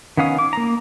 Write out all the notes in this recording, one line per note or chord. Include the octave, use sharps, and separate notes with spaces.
D#3 B3 C#4 F5 D#6
D6
A#3 A#5